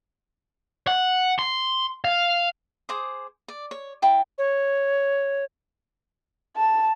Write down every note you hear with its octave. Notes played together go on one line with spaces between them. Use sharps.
F#5
C6
F5
G#4 C5 D6 D#6
D5
C#5
E4 G5 A5
C#5
A5